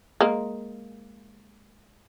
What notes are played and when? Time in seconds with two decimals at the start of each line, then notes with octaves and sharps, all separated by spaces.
0.21 G#3 A#3